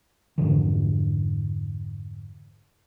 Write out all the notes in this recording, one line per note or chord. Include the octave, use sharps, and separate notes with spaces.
F2 G#2 D3 E3